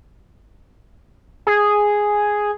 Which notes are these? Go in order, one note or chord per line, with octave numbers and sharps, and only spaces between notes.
G#4